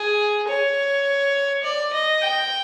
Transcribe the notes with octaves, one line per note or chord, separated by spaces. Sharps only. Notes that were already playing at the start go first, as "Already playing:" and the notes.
Already playing: G#4
C#5
D5
D#5
G5